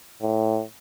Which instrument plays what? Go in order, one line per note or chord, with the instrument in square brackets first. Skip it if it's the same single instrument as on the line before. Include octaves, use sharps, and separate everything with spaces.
[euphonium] A2